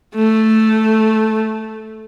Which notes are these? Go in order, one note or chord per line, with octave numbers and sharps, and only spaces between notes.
A3